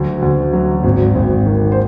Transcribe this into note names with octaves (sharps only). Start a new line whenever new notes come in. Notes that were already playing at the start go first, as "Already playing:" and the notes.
Already playing: D2 F#3
D2
F#3
G#1
G#1
D#3
C5